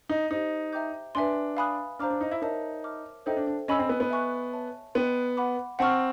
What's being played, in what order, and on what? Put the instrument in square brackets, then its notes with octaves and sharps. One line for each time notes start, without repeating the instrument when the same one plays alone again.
[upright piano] D#4
[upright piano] D#4 [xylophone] G4 C5 D#5
[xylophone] E5 G5 A#5 D6 G6
[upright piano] D4 [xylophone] B4 E5 G#5 C6
[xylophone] F5 G#5 B5 D#6 F#6
[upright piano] D4 [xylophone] C5 F5 A#5 D6 F6
[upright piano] D4
D#4
E4
[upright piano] D#4 [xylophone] A#4 C#5 E5 A5
[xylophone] E5 A5 D6 F6
[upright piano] D#4 [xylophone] A4 C5 E5 G5
[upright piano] D4
D4
[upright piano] C#4 [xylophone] D#5 G#5 B5 E6
[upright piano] C4
B3
B3
[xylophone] E5 G#5 C#6 F#6
C#5 E5 A5
[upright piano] B3 [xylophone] D#5 G5 C6
[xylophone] F#5 B5 D6
[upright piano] C4 [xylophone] F#5 A5 C#6 F6